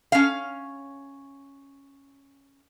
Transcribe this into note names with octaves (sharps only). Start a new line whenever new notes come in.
C#4 F5